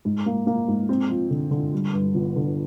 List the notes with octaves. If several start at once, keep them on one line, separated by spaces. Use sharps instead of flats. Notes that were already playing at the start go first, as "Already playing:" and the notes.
G#2
A#3
A#3
G#2
C4
F3
D3
D3
G3
G2
G1
D3